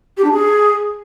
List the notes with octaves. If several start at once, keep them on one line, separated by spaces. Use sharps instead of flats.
G4
D4
G#4